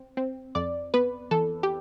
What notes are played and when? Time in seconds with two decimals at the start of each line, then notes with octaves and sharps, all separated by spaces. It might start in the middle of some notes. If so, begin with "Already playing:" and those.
Already playing: C4
0.17 C4
0.55 F2 D5
0.94 B3 B4
1.31 E3 A4
1.63 G4